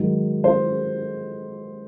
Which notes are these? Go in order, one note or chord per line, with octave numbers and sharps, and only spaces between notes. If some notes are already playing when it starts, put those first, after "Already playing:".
Already playing: G#2 D#3 F#3
C5